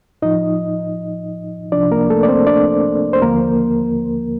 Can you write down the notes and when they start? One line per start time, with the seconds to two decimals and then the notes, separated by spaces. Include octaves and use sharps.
0.22 A2 F3 D#4 D#5
1.72 C2 C3 F3 D4 D5
1.91 A#3 A#4
2.10 A3 A4
2.23 D5
2.28 C4 C5
2.47 D4 D5
3.13 C5
3.21 D#2 D3 F3 A#3 A#4